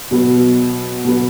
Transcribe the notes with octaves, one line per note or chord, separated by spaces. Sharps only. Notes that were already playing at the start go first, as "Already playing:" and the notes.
B2 F#3 B3
B2 F#3 B3